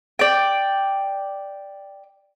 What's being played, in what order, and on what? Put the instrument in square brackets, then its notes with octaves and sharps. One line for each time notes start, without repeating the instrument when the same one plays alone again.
[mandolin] D5 G5